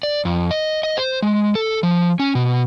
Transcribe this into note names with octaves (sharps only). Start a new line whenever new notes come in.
D5
F2
D#5
D#5
C5
G#3
A4
F3
C#4
B2